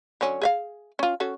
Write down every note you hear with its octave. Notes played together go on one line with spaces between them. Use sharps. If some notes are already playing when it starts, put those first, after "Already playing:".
D3 F#3 C#4
G#4 E5 F5
C#4 F4
C#4 F#4 A4